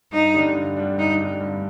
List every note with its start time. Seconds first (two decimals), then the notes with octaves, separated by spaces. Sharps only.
0.12 G2 D#4
0.34 D3 G3 D4
0.55 G2
0.77 D3 G3 D4
0.97 G2 D#4
1.20 D3 G3 D4
1.40 G2